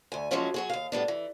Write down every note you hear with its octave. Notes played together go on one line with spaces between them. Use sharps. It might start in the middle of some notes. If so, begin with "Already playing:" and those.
D2 G#5
F3 F#3 G#3 A#3 C#4 E4
F#3 F#4 G#4
D#2 F5
A2 G3 B3 D4
E3